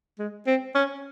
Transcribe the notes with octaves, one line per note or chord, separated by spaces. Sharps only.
G#3
C4
C#4